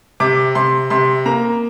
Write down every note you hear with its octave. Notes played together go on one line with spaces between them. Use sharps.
C3 D6
C3 C6
C3 C6
A#3 A#5